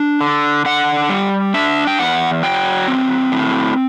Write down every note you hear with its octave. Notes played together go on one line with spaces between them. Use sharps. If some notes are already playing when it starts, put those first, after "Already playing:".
Already playing: D4
D3
D3 F#5
G3
D4 E5
G5
E2 F#5
F#3 G5
C4
A2